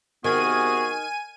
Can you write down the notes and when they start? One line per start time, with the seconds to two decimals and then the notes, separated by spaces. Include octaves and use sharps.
0.24 C3 D#3 B3 F#4 G#4 G#5 D#7